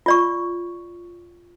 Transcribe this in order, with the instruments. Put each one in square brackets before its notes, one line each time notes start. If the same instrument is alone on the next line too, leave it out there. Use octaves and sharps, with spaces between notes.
[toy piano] F4 D5 C#6